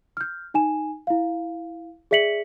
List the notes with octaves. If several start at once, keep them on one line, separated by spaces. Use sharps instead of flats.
F6 G6
D#4 G#5 E7
E4 F5
G#4 D5 E5 B6 C#7 F#7